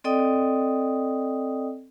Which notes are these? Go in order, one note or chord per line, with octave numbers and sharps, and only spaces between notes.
C4 A4 D5 D#5 G5 D#6